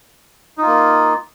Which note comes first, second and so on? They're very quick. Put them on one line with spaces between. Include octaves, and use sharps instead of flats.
D#4 F4 A#3